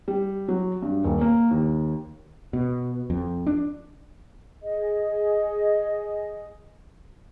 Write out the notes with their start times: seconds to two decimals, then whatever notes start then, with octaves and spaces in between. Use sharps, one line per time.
0.08 G3
0.48 F#3
0.82 G2
1.04 D#1
1.21 A#3
1.51 D#2
2.53 B2
3.10 F2
3.46 D4
4.62 G#4 D#5